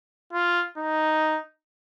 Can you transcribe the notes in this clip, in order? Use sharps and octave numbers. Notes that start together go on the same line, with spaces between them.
F4
D#4